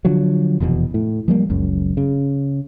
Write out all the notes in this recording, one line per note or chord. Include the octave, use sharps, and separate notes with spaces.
D3 F3 F#3
F1 E2 G#2 B2
A2
F3 G3 A#3
F#1 C#2 F#2
C#3